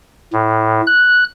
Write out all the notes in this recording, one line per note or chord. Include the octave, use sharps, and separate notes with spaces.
A2
F#6